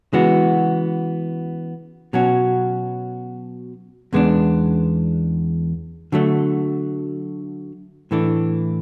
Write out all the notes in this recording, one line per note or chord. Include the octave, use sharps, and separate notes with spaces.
C#3 E3 G#3 B3 F#4
B2 F#3 C#4 F#4
E2 C#3 G#3 B3 D4
D3 F#3 A3
A2 E3 A3 D4